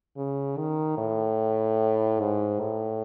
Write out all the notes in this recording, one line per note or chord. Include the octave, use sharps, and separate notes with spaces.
C#3
D#3
A2
G#2
A2